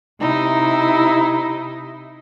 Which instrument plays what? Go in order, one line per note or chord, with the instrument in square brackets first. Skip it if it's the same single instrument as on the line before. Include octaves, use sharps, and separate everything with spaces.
[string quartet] C3 D#4 E4